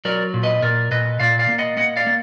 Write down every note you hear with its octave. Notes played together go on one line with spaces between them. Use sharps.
F#3 A#4 D5
A#2
B4 D#5
A#2 A#4 D5
A#2 B4 D#5
A#2 D5 F5
D5 F5
A#3
D#5 F#5
A#3 D#5 F#5
D5 F5
A#3